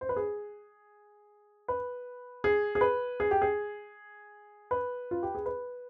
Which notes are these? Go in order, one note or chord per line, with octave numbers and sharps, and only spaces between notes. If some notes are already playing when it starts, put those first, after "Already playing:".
C5
B4
G#4
B4
G#4
G#4
B4
G#4
G4
G#4
B4
F4
G4
G#4
B4